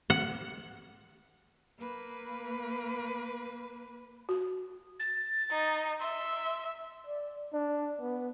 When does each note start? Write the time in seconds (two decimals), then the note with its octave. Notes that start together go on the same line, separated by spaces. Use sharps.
0.10 F#5
1.79 A#3 B4
4.29 F#4
5.00 A6
5.51 D#4
6.01 E5 C6
7.07 D5
7.53 D4
8.01 B3